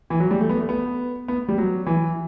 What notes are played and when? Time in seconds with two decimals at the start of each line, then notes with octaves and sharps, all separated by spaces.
0.10 E3
0.20 F#3
0.31 G3
0.41 A3
0.49 B3
0.59 A3
0.69 B3
1.28 B3
1.48 G3
1.58 F#3
1.86 E3